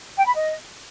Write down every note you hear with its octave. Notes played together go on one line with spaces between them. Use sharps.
G5
B5
D#5